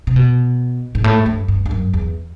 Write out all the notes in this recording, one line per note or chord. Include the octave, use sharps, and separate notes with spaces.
C3
B2
G#2
A2
G2
G2
G2
F#2
E2